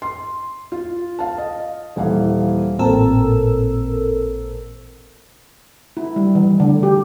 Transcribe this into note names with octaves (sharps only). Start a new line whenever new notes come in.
C6
F4
F5 A5
D#5
D#1 E3 F5
A1 A#2 C4 A4 A#4 E6
E4
G3
E3
D3
G4